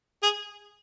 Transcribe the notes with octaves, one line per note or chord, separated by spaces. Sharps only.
G#4